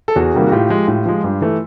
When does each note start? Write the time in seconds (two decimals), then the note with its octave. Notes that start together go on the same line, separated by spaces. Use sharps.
0.08 A4
0.16 E2 F#4 G#4
0.34 C3 D#3 G3 A#3
0.47 F#4
0.52 A2 F4 G4
0.70 F3 G#3
0.88 A2
1.06 F3 G#3
1.24 G2
1.41 E3 A3